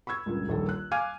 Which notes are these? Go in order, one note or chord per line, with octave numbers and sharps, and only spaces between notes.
B5 C#6 E6 G#6
C#2 G2 A#2
D#1 A#1 D#3 G3 A4
F#6
F5 G#5 D6 F6 G#6 D#7